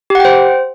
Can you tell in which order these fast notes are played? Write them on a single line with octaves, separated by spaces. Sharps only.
G4 F#5 G5 C5